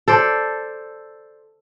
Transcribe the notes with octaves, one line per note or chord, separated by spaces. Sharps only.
A4 C5 D5